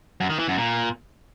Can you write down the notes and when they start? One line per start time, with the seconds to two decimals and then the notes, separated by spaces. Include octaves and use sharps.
0.20 F#2
0.30 D#3
0.39 E3
0.48 F#2
0.58 A#2